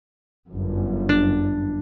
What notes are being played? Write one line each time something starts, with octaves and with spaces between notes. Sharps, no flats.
G1 F#2
D4